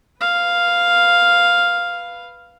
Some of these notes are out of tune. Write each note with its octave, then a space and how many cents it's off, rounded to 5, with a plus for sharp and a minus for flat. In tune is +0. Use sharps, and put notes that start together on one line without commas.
B4 +0 F5 +0